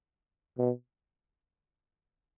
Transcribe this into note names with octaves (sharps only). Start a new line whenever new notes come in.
B2